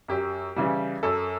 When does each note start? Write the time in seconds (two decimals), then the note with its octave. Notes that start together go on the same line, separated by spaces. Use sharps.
0.08 F#2 G4
0.56 C#3 E3 G3
1.03 F#2 A4